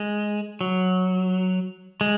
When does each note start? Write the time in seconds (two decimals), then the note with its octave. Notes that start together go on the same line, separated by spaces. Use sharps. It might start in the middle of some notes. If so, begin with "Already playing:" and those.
Already playing: G#3
0.61 F#3
2.01 G#3